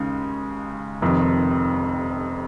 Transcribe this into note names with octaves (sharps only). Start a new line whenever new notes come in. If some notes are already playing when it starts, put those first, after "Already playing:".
Already playing: D#2 C#3 G#3 D#4
F1 F2 C3 D#3